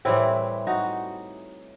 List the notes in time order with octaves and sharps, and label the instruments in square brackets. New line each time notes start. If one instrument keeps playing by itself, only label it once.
[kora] A2 E3 G3 C4 E4
D#4 F#4